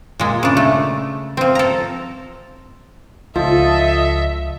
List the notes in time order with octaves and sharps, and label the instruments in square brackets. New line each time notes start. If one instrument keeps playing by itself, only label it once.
[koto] A#2 G#3
C#3 D4
A3
F3 C4
A4 A#5
[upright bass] C#2 [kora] F3 [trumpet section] A4 D#5 [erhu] E5